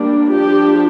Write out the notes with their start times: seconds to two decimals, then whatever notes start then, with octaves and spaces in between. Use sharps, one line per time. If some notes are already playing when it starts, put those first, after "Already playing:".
Already playing: G3 A#3 D4
0.31 F3 D4 G4